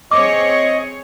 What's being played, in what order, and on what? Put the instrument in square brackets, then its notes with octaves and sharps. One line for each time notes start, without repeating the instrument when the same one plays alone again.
[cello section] C4 G#4 C#5 [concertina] D#5 [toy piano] D6